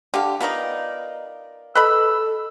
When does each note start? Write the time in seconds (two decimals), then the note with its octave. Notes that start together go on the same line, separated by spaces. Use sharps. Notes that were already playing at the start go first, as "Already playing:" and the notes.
0.14 D3 G4 F5
0.40 B3 D#4 F4 A#4 D5
1.75 A4 B4 D#5 B5 E6